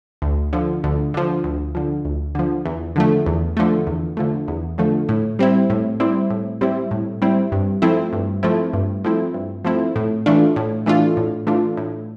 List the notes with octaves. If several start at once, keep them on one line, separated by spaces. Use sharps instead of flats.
D2
D3 F3
D2
D3 F3
D2
D3 F3
D2
D3 F3
E2
D3 F3 A3
E2
D3 F3 A3
E2
D3 F3 A3
E2
D3 F3 A3
A2
G3 C4 E4
A2
G3 C4 E4
A2
G3 C4 E4
A2
G3 C4 E4
G2
F3 A3 C4 E4
G2
F3 A3 C4 E4
G2
F3 A3 C4 E4
G2
F3 A3 C4 E4
A2
E3 A3 D4 F4
A2
E3 A3 D4 F4
A2
E3 A3 D4 F4
A2